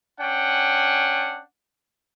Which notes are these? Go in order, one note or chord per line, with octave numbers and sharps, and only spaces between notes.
C#4 D4 F#5 G5